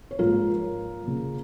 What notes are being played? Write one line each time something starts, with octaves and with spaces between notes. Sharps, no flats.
C#5
G#2 F3 A#3 F4 A#4
C#3 A#3